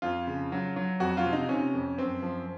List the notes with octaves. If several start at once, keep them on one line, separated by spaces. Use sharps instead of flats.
F2 F4
C#3
F#3
F#3
F2 F#4
F4
C3
D#4
C3 C#4
F2
F#2 C4
F3